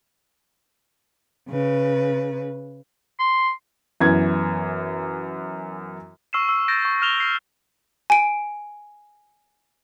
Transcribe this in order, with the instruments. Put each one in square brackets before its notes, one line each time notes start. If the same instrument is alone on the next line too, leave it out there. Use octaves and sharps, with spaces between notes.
[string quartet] C#3 B4
[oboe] C6
[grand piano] F#2 E3 B3 G#6
[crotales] C#6 E6 F6 C7 D#7 E7
E6
G6 A6 A#6 D7
C#6 G6
F6 E7 F7 G7
C7
[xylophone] G#5 D7